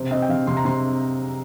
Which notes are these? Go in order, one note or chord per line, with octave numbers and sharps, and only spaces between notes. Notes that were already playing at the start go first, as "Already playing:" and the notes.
Already playing: C3 C5
C4 D#5
G5
C3 F5
C3 C6
A#5
C3 C6